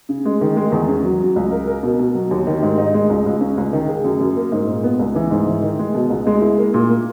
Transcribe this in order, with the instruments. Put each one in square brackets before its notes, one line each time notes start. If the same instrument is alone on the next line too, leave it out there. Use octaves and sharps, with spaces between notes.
[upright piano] C#3
G#3
D#3
G#3
E2
C#4
F#3
F#3
C#2
A#4
A#4
B2
B2
F#3
D#2
D#3
G#2
D#4
G#3
C#2
C#2
C#4
C#2
D#3
G#4
F#2
F#2
A#3
G#2
A#2
B3
C#2
E3
G#2
E3
D#3
G#3
B2
C#2
G#3
E4
A#3
A#2
A#3